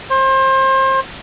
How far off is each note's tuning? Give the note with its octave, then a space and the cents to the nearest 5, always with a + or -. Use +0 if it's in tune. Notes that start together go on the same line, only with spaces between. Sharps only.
C5 +30